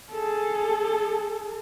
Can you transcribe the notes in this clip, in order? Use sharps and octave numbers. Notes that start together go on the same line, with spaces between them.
G#4 A4